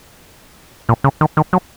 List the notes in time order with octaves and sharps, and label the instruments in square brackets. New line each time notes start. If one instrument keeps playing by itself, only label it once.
[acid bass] A#2
C#3
D#3
D#3
F#3